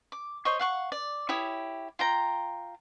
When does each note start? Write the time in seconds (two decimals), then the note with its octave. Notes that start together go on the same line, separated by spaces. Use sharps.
0.12 D6
0.45 C5 C#5 D#5 C#6
0.59 F5 F#5 C#6
0.92 D5
1.29 E4 G4 C#5 D#6
1.99 F4 G5 A#5